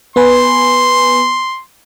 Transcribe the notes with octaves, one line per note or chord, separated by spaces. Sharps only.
B3 B4 G#5 C6